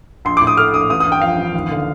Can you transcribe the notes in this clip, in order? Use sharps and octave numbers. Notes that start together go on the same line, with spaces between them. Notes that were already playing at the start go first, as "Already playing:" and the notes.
A#1 C6
A2 D6
D#6
A3 F6
A#1 D#6
A1 D#6
D#6
G2
G5
F3 F5
A1
D#2
D3